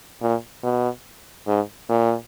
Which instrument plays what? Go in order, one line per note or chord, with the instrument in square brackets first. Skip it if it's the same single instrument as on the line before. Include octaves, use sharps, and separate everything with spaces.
[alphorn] A#2
B2
G#2
A#2